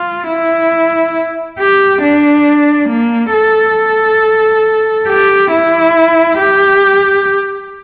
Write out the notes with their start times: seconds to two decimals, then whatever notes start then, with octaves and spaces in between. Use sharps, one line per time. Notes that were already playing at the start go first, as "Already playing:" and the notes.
Already playing: F4
0.28 E4
1.59 G4
2.02 D4
2.89 A#3
3.33 A4
5.08 G4
5.51 E4
6.38 G4